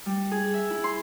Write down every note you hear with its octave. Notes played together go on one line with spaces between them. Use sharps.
G3
G#4
E5
E4
C6